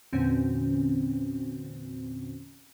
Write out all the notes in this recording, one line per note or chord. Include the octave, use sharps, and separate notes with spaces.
E2 A#2 D3 C4 C#4 F#4